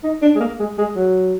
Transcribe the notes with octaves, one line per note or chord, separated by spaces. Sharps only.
D#4
D4
G#3
A#3
G#3
G#3
F#3